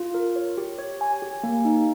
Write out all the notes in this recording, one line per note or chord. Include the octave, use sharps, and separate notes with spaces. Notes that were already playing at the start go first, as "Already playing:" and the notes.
Already playing: F4
A#4
C#5
G4
C#5
G#5
G4
A#3
D#4